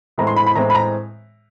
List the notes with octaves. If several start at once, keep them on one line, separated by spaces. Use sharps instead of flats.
A2 E3 G#3 C4 A#5
C6
B5
B5
A2 E3 G#3 C4 A#5
B5
A#5